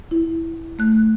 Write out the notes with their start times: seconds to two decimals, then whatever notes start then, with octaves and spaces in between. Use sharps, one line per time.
0.11 E4
0.79 A3 F#6